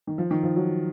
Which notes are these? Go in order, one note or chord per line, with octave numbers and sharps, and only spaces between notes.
D#3
F3
D#3
F3
F#3